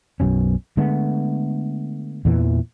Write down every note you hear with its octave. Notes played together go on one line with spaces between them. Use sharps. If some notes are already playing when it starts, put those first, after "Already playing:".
B1 F#2 B2 C#4
D3 G#3 A3 B3
E2 A#2 E3